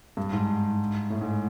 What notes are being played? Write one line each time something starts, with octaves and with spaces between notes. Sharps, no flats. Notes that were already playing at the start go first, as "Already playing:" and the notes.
G2
G#2
A2
G#2